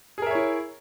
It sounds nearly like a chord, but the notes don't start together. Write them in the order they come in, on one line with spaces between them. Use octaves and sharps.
G#4 A#4 E5 C#5 E4